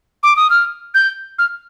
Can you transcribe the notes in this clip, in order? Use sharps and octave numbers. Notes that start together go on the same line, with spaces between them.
D6
D#6
F6
G6
F6